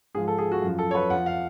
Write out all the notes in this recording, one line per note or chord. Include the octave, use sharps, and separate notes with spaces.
G#2 F3 G#4
A4
G#4
F#4
F#2 F3
A4
C#5
B4
F2 F3 F#5
F5